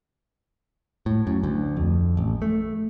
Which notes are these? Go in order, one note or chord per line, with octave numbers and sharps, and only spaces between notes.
A2
F#2
D2
F2
A1
A3